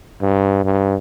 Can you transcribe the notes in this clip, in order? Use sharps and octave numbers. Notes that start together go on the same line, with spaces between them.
G2
G2